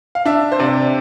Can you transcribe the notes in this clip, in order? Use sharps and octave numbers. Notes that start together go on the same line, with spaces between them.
F5
D4 E5
C5
C3 D5